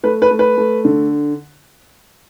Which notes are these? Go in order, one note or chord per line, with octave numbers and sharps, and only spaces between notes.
A3 B4
B4
A3
B4
A3
D3